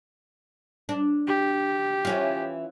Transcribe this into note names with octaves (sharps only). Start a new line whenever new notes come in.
D4
G4
E3 C#4 F4